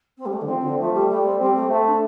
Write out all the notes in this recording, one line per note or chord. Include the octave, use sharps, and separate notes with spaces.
C4
G3
A3
D3
F3 C4
F3
D3
F3 A3
G3
G3 A3
C4
G3 C4
A3
A3 C4
D4